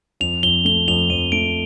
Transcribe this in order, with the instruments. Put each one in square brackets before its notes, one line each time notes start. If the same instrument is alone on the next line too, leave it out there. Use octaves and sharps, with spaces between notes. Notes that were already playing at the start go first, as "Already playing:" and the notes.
[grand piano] F2 [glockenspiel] F7
[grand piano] F2 [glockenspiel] G7
[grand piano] A3 [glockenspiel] G7
[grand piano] F2 [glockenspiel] F7
[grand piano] F2 [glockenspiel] D#7
[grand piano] A3 [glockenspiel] D7